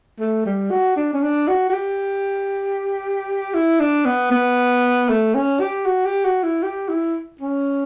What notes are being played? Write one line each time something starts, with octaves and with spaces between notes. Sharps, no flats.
A3
G3
F#4
D4
C#4
D4
F#4
F#4
G4
E4
D4
B3
B3
A3
C#4
G4
F#4
G4
F#4
E4
G4
E4
C#4